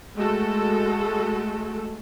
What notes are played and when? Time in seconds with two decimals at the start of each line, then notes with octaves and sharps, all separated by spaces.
0.15 G#3 A3 F#4 A4